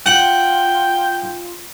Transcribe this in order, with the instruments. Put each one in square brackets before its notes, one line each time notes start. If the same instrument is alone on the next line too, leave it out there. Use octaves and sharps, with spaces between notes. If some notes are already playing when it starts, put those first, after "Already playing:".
[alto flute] F4 [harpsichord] F#5 [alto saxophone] G5